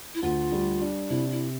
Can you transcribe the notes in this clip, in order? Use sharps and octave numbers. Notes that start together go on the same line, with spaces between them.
E4
D2 F4
G3
D4
C3 E4
E4